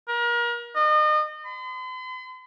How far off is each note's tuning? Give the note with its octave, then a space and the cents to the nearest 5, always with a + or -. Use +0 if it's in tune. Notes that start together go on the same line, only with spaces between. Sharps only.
A#4 +35
D#5 -35
C6 -45